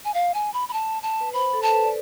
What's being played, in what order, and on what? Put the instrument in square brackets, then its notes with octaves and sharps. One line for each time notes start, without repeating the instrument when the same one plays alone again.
[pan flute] G#5
F5
G#5
B5
B5
A5
A5
[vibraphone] B4
[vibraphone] C5 [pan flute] B5
[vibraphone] A4
[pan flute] A5
[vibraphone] B4
D5